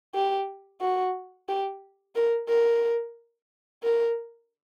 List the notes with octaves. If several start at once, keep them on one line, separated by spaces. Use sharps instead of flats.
G4
F#4
G4
A#4
A#4
A#4